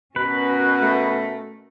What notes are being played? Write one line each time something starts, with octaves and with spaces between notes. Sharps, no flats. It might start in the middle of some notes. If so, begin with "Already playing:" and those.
B2 C#4 F#4 A#4 B4
A3